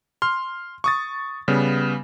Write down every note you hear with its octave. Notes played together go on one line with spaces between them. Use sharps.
C6 F6
C#6 D#6 A6
C#3 G3 B3